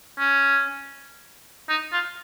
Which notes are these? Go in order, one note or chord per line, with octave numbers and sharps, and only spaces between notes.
C#4
D#4
F4